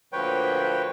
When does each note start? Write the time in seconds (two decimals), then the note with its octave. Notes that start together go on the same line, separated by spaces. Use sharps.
0.13 D2 A#2 F3 B4 C#5 G5